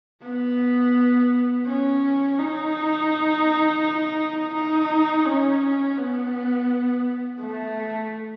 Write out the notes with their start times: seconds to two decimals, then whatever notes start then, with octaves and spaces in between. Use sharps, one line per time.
0.23 B3
1.66 C#4
2.38 D#4
4.54 D#4
5.25 C#4
5.97 B3
7.40 A3